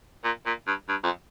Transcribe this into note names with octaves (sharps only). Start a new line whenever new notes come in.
A#2
A#2
G2
G2
F2